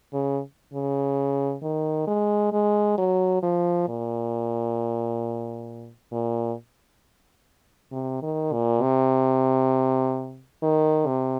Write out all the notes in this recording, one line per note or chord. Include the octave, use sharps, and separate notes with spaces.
C#3
C#3
D#3
G#3
G#3
F#3
F3
A#2
A#2
C3
D#3
A#2
C3
D#3
C3